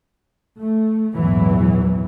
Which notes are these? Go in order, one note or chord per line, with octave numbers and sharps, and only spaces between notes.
A3
A#1 E2 G#2 E3 F#3